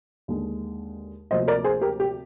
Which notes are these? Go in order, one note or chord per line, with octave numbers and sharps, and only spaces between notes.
D#2 D3 G#3
D2 C3 F3 A#3 C5 D#5
A#4 D5
G#4 C5
G4 A#4
G4